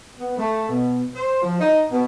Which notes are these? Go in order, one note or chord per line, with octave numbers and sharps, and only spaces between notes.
B3
A3
B2
C5
F3
D#4
B2